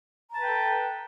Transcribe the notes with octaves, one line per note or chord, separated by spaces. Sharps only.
A4 B4 G5 A5 A#5